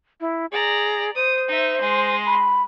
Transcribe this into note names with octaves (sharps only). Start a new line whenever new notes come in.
E4
G#4 D5 A#5
C5 D#6
D#4 E5
G#3 C6
B5